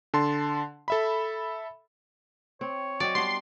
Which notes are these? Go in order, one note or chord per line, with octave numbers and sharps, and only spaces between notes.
D3 A5 C6
A4 E5 B5
C4 C#5
F#3 C4 D5 D#5
G3 B3 D4 C6